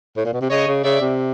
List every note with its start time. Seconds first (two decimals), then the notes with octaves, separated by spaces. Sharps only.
0.17 A2
0.25 A#2
0.34 B2
0.41 C3
0.50 C#3 C#5 D#5
0.68 C#3
0.84 C#3 D5 E5
1.01 C3